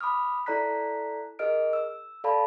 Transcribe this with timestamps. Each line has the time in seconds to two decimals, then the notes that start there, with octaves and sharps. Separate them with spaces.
0.01 B5 D6 D#6 F6
0.46 E4 A4 D5 A#5 F#6 B6
1.39 G#4 A#4 D#5 F6 D7
1.73 E6
2.24 A4 D5 F5 A5 B5